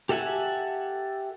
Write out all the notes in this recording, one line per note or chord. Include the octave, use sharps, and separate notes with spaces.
G4 A4 E5 F#5 G#5